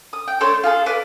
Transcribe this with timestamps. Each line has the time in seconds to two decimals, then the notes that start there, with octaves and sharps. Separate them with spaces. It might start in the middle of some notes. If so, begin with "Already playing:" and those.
0.13 D#6
0.28 G5
0.41 A3 D4 C5 C#5
0.64 F4 G#4 A4
0.86 A4 B4 D5